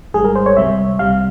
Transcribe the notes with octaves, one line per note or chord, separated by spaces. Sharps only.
G#1 G#2 G3 G#4
A#4
C5
C#5
C#2 C3 G3 E5
C2 C3 G3 F5